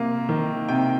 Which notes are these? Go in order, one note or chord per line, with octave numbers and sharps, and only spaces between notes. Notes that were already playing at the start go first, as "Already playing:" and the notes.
Already playing: C3 A#3
D#3
C3 G5